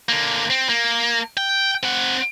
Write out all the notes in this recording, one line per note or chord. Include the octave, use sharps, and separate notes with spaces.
D3 A#3
C4
A#3
G5
C4 F#5